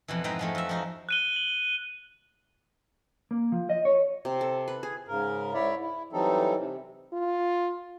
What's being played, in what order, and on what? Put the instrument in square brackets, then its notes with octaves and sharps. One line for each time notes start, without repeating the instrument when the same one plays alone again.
[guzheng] F2 B2 E3
G#2 G#3 C4 B4 G5 A#5
F3 G#3 A3
F2 E5
F3 D#4 F#4
[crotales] F#6 D#7 G7
F#7
[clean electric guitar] A#3
F3
D#5
C#5
[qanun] C3
A4
B4
G#4
[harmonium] G#2 C#3 A#4
G#2 E4 C#5 D5 E5
E4
E3 F#3 G3 C4 D#4 A4
C3
[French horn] F4